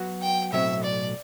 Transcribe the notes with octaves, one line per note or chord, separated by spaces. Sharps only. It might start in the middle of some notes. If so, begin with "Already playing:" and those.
Already playing: F#3 B3 F#4
G5
B1 A2 F#3 C4 E5
D5